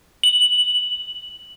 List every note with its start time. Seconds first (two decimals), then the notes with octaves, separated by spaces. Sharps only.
0.23 F#7